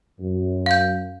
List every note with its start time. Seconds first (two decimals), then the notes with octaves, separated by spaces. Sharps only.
0.20 F#2
0.66 F5 G6